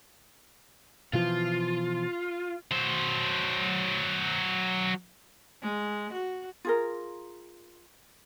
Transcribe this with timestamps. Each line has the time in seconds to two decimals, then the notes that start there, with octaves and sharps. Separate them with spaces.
1.13 B2 E3 F3 F4
2.71 F#3 C5
5.62 G#3
6.13 F#4
6.65 F4 G#4 A#4